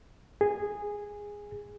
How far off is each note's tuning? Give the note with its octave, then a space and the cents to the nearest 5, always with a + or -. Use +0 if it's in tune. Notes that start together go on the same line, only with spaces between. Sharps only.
G#4 -10